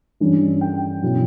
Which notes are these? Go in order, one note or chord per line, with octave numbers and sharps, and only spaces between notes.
G2 E3 G3 C#4
G5
B2 F#3 C#4 E4